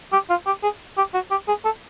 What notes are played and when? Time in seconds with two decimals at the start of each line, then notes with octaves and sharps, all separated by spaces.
0.13 G4
0.30 F4
0.47 G4
0.63 G#4
0.97 G4
1.14 F#4
1.31 G4
1.48 G#4
1.65 A4